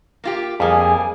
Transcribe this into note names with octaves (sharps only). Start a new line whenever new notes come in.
A#3 F4 G4
F2 G3 A#3 G#4 G#5